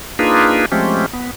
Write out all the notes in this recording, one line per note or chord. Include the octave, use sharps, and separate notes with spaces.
A#3 D4 D#4 F4 G#4 B4
F3 G#3 A3 C4 C#4 G4
B3